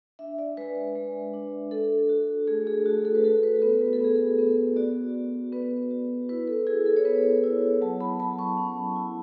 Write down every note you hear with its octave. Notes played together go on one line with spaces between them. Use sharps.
D4 E5
D5
G#3 B4
G#3
D4
D4 A4
F#4
A3 G#4
G#4
A3 F#4
A4
B4
F#4 A4
B4
B3 B4
B4
A4
B3 G#4
A4
B3
F#4 D5
F#4
B3 B4
F#4
E4 B4
A4
E4 G#4
A4
C#5
B3 B4
E4 C#5
F#3 A5
B5
F#3 A5
C#6
C#4
E4